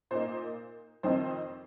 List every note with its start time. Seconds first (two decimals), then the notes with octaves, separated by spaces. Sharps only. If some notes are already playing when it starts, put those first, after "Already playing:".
0.11 A#2 A#3 D#4 C5
1.03 F2 D#3 C4 D#4 C5